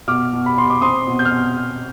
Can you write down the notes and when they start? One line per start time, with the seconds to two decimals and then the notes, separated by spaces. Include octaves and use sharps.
0.08 B2 D6 F6
0.33 B2
0.46 B5
0.57 B2 C6
0.70 D6
0.81 C4 C6 D#6
1.07 B2
1.19 G6
1.25 F6
1.31 B2